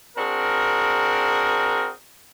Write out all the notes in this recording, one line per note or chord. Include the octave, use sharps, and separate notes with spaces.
C4 D4 F#4 G#4 A#4